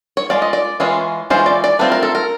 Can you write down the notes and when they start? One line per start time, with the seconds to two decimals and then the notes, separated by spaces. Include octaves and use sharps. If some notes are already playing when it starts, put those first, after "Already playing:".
0.17 C#5
0.30 G#3 C4 F4 D5
0.42 D#5
0.53 D5
0.80 E3 G#3 C#4 F4
1.30 E3 G#3 C#4 F4 C5
1.46 D5
1.64 D5
1.79 A3 C4 F4 B4
1.92 A#4
2.03 A4
2.15 A#4